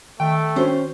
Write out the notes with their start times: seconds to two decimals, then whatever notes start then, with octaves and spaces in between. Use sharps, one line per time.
0.20 D#3 A3 G5
0.56 C#4 D4 F#4 C5